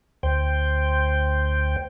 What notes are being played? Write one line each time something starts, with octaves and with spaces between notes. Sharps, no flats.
D2 C5 G5